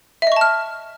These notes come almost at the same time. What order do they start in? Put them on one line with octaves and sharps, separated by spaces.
E5 D#5 C#6 A5 F6